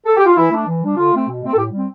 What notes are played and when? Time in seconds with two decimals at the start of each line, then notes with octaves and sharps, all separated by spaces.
0.06 A4
0.16 G4
0.26 F4
0.36 E3 E4
0.51 A3 D4
0.66 E3
0.82 G3 D4
0.96 D3 F4
1.12 A3 C4
1.27 B2
1.42 A3 C4
1.52 A4
1.57 A2 G4
1.72 G3 C4